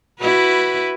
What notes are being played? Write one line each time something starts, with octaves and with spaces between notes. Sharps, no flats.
E4 F#4 B4